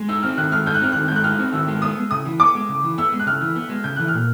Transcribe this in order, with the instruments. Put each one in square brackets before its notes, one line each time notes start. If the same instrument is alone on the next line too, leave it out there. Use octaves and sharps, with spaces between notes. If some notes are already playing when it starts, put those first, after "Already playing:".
Already playing: [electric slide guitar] G#3
[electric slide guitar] D#4 [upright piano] E6
[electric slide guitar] C4 [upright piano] F6
[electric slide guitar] D#3 [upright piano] F#6
[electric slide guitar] G#3 [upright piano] F6
[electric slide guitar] D#4 [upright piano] G6
[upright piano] F#6
[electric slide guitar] C4 [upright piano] F6
[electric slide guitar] D#3 [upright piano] F#6
[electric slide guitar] G#3 [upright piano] G6
[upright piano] F#6
[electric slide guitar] D#4 [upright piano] F6
[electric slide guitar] C4
[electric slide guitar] D#3 [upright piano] E6
[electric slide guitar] G#3
[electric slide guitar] B3 [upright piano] D#6
[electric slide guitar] G#3
[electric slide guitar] C#3 [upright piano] D#6
[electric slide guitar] E3
[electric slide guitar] B3 [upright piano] D6
[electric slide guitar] G#3
C#3
E3
[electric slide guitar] B3 [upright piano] E6
[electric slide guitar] G#3
[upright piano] F#6
[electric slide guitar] C#3 [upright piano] F6
[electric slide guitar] E3
B3
G#3
[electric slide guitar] C#3 [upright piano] G6
[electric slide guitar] E3 [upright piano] F#6
[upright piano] F6
[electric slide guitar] A#2